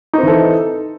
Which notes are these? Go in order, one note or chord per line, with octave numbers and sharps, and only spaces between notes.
E3 C4 D#4 A4